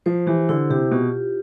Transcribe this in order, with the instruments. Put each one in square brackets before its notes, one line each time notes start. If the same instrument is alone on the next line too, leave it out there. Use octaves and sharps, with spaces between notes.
[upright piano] F3 [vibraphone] C5
[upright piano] E3 [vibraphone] G4
[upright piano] D3 [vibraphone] E4
[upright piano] C3 [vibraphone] G4
[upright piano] B2 [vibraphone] F4